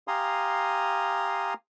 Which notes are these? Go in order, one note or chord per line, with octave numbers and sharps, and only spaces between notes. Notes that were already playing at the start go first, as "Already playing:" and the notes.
G4 F5 G#5 A#5 C6 D#6